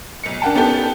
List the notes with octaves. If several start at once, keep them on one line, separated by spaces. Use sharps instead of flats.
B1 C#7
D4 A#4 F#5 G5 A5
B3 C#4 D#4 G4 A4